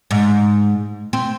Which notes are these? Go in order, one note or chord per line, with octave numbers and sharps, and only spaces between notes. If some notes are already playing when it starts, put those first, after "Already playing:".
G#2
C4